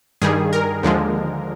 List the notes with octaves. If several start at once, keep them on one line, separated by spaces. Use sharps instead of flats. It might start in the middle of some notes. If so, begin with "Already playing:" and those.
G2 D#3 G3 G#4
A#4
D#2 D3 F3 G#3